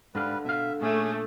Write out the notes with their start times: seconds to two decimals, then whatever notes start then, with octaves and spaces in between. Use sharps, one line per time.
0.15 G#2 D3 G3 D4 B4 F5
0.45 B2 E5 F5
0.82 A#2 A3 C#4 G#4